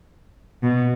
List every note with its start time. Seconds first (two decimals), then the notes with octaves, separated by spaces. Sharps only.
0.63 B2